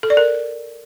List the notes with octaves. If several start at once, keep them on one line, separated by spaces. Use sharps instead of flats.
A4
D5
A#4